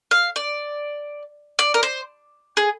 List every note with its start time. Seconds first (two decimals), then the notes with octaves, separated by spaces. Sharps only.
0.11 F5
0.36 D5
1.59 D5
1.74 A#4
1.83 C5
2.57 G#4